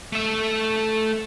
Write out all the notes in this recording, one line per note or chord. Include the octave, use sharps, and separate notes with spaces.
A3 E5